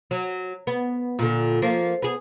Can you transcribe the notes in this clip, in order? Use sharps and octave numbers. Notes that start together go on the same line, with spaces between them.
F#3
B3
A#2 D3
F3 A#3
B3 G#4